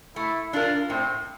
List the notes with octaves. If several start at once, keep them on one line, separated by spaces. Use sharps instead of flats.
A3 E4
D4 F4 A#4
A2 C4